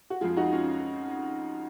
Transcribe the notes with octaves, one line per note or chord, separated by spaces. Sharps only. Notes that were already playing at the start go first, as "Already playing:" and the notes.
F#4
F2 F3 G#3 F4 G#4
D#4 F#4
C#4 F4